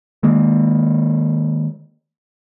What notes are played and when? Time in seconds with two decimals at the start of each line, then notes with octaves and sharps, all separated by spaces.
0.23 D#3 G#3 A#3